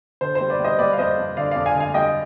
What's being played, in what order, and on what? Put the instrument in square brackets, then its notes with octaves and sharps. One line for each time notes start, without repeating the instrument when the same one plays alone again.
[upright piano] D3 C5
C5
G3
B4 D5
G3 C5 D#5
G3 B4 D5
F5
F2 C5 D#5
F2
D3 D5 F5
F2 D5 F5
F5 G#5
D3
F5 G#5
G3 D#5 G5